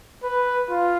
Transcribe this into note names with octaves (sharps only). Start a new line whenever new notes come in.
B4
F4